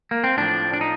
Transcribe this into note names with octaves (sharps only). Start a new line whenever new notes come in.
A#3
C4
A2 F3 D4
D4
D#4